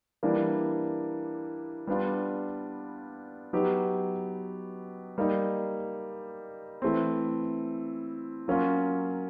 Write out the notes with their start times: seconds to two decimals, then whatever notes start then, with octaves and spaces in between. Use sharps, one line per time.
0.23 E3 G3 A#3 D4
1.87 G3 B3 D4 F4
3.53 F#3 B3 D#4 G4
5.18 G3 A#3 D#4
6.82 E3 A3 C4
8.48 F#3 A#3 C#4 F4